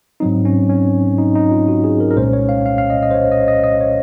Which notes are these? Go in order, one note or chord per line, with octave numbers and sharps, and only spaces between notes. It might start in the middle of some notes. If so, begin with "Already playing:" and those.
G#2 F#3 C4 D#4
C#4
C#4
D#4
D#4
F4
F#4
G#4
A#4
A#4
C2 A#2 G#3 C#4 C5
C#5
F5
F5
F5
D#5
D#5
C5
C#5
D#5
D#5
D#5
C#5